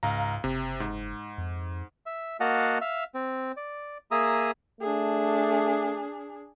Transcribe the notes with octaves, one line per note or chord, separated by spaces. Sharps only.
C#2 G#2 F5 A#5
F#1 C3
G#2
F2
E5
A#3 F#4 D#5 F5 F#5 A5
E5 F5
C4
D5
A#3 G#4 E5 A#5 D#6
A3 D4 G#4